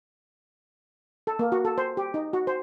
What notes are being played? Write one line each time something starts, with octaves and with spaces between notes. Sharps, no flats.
A4
A#3
F#4
A4
C5
G4
D#4
F#4
C5